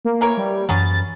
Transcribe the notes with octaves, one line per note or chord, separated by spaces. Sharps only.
A#3
E3 A#4 C#5
G3
F#2 E3 F#3 B3 C#4 A6